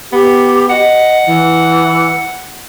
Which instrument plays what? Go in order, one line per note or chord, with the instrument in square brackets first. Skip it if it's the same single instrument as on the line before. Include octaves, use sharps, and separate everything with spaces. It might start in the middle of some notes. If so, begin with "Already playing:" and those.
[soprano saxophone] B3 [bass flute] G4
[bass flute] D#5 [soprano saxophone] F#5
[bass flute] E3